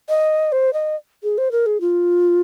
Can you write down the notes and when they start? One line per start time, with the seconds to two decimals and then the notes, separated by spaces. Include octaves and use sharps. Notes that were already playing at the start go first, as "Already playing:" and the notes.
0.09 D#5
0.52 C5
0.73 D#5
1.23 G#4
1.38 C5
1.51 A#4
1.66 G#4
1.81 F4